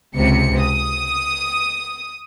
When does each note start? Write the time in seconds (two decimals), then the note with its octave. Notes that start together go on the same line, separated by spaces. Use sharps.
0.15 C#2 C3 C#7
0.61 D#6